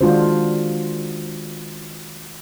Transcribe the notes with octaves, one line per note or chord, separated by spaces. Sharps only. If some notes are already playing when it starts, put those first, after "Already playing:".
D#3 G#3 D4 F4 F#4 C5